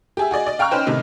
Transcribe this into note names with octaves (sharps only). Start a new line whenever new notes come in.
G4 G#4 E5
F#4 G#4 D5 D#5
D5 D#5
F5 G5 A#5 C#6 F6 F#6
C#4 D#4 B4 C5 G5
A2 C3 D#3 D#4